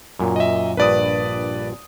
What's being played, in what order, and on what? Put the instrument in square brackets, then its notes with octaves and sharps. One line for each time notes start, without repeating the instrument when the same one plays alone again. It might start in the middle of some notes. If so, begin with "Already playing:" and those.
[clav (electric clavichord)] F#2 A#2
[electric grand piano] D#5 E5
[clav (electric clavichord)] A#1 G2 [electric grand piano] B4 D5 D#6